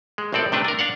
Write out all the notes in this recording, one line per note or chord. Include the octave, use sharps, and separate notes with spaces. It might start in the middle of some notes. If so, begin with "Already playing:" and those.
G#3
A#1 A2 C4 A4 D5
C3 A3 D4 B4
D4 A#4
D4 F5 F#5